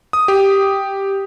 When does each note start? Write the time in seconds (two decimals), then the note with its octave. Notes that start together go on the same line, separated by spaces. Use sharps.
0.13 D#6
0.28 G4